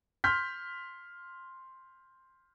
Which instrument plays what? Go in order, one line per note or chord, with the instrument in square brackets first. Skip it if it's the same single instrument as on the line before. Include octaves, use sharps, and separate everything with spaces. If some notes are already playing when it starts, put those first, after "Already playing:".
[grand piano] C6 F6 G6 B6